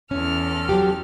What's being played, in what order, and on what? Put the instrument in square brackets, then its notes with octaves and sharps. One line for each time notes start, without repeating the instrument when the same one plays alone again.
[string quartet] E2 A4 F6 [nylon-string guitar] C#4
[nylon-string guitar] F#3 G4